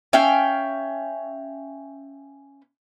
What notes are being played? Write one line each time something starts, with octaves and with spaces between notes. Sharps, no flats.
C#4 E5 F5 G5